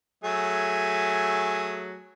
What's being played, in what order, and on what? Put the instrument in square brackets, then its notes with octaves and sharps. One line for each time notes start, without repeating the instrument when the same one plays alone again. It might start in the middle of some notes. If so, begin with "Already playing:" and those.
[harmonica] F#3 A3 G#4